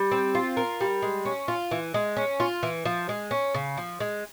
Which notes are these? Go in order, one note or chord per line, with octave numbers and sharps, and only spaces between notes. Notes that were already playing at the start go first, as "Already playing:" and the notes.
Already playing: G3
C4
F4
A#4
G3
G#3
C#4
F4
E3
G#3
C#4
F4
E3
F3
G#3
C#4
C#3
F3
G#3